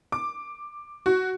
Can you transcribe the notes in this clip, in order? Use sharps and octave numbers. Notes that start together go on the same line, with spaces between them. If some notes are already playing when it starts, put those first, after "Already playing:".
D6
F#4